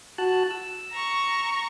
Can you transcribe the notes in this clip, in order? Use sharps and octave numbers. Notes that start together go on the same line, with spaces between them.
F#4 A5 F#6
E6
A#5 C#6